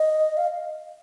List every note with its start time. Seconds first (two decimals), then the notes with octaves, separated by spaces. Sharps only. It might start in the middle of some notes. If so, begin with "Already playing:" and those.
Already playing: D#5
0.37 F5